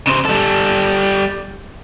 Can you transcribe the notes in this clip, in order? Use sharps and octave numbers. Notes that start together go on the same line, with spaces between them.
C#3 C5
G3 A4